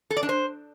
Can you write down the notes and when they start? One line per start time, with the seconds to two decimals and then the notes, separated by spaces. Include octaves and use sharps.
0.10 A4
0.17 D5
0.23 D4
0.29 C5